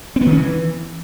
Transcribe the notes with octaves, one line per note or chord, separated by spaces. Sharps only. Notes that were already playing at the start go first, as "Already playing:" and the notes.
C4
B3
D#3
C#4
E3